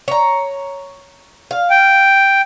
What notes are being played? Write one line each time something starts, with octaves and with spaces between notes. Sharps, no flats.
C#5 A#5
F5
G5